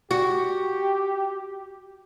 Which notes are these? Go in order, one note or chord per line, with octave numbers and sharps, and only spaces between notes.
F#4 G4